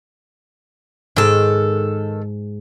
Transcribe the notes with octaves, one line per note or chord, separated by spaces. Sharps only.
G#2 D#3 A4